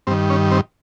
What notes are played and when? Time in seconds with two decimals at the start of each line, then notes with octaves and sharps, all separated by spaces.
0.07 G2 D#3 C4
0.30 C#4
0.51 C4